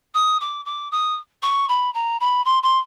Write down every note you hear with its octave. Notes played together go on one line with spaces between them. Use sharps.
D#6
D6
D6
D#6
C#6
B5
A#5
B5
C6
C6